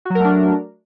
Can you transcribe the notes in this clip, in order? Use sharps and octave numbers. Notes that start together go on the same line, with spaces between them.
F#3 A3 D4 F#4 A#4